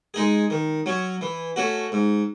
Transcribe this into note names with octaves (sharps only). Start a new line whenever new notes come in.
G#3 D#4 G#4
D#3
F#3 C#4
E3
A3 C#4 F#4
G#2